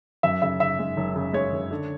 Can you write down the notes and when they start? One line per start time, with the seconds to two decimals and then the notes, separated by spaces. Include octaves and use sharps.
0.23 F#2 E5
0.42 C#3 E5
0.60 C#3 E5
0.79 G#3
0.97 F#1
1.15 C#3
1.33 G#3 C#5
1.53 F#1
1.71 D3